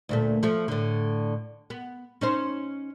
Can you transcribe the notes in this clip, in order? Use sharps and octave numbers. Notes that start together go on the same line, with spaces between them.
D2 A#2 A3
F3 A3
A2 D3
B3
C#4 D#4 C5